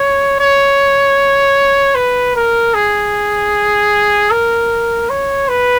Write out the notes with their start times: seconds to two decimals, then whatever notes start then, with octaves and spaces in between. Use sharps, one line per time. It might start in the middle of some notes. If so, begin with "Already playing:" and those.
Already playing: C#5
0.40 C#5
1.95 B4
2.35 A#4
2.74 G#4
4.31 A#4
5.10 C#5
5.49 B4